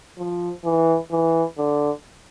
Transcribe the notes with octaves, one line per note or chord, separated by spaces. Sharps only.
F3
E3
E3
D3